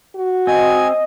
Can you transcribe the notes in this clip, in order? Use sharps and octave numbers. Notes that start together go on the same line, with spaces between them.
F#4
C4 D#5 G#5